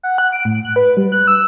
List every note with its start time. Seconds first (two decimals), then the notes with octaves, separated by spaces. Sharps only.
0.03 F#5
0.18 F#6
0.32 D7
0.45 A2
0.65 F#6
0.76 B4
0.97 G3
1.12 F#6
1.27 E6